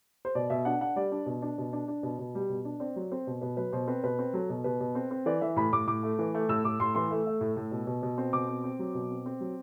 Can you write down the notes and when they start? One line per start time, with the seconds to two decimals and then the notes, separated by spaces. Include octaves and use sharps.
0.25 C5
0.35 B2 D5
0.50 B2 E5
0.65 D4 F#5
0.81 D4 F#5
0.96 G3 D5
1.12 D4
1.26 B2
1.42 D4
1.58 B2
1.73 D4
1.88 D4
2.03 B2
2.19 B2
2.35 G3
2.49 B2
2.65 D4
2.80 C4 D5
2.96 F#3
3.12 C4 C5
3.27 B2
3.41 B2 B4
3.57 F#3 B4
3.73 B2 C5
3.88 C4 B4
4.04 B2 B4
4.19 C4
4.34 F#3 A4
4.50 B2
4.64 B2 B4
4.80 B2
4.95 C4
5.11 C4
5.26 E3 D5
5.41 E3 E5
5.56 A2 B5
5.73 A2 D6
5.87 A2 D6
6.03 A3
6.19 E3
6.34 A3
6.49 A2 E6
6.64 A2 D6
6.80 A2 C6
6.95 E3 C6
7.11 A3
7.27 A3
7.41 A2
7.57 A2
7.71 B2
7.87 B2
8.03 B2
8.18 C4
8.33 B2 D6
8.49 C4
8.64 C4
8.79 F#3
8.94 B2
9.11 C4
9.26 C4
9.40 F#3